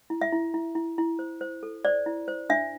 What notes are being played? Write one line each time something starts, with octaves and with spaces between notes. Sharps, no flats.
E4
E5
E4
E4
E4
E4
C5
C5
A4
C5 D5
E4
C5
D4 E5